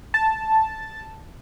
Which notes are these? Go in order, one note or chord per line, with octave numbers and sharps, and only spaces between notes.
A5